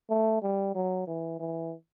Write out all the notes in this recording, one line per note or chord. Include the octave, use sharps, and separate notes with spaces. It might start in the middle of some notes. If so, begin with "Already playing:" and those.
A3
G3
F#3
E3
E3